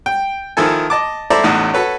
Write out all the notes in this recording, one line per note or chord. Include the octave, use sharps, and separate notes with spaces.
G5
D#3 F3 E4 A4 G#5
D#5 A5 D6
E4 A4 C5 D5 E5 A#5
A1 E2 A2 D#4
F#4 A4 B4 C#5